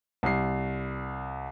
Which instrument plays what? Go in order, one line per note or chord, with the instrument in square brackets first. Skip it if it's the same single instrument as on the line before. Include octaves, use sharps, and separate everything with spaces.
[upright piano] C2 C7